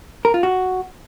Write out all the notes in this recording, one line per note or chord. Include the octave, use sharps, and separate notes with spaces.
A#4
F4
F#4